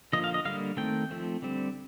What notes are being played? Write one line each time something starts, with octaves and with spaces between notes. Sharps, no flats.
D3 F3 A#3 D#5
F5
D#5
D3 G3 A#3 F5
D#3 A3 C4 G5
F3 A3 C4
D3 G3 C4